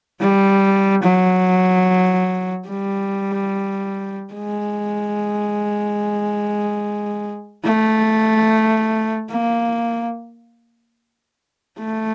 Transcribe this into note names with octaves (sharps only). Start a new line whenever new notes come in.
G3
F#3
G3
G#3
A3
A#3
A3